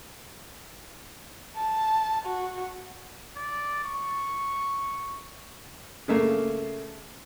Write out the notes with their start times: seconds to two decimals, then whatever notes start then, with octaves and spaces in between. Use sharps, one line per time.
1.56 A5
2.26 F#4
3.36 D5
3.84 C#6
6.08 C#3 A3 A#3